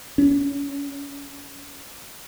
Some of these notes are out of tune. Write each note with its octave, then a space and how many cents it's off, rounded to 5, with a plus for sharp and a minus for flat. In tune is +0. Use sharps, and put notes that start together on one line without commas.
C#4 +25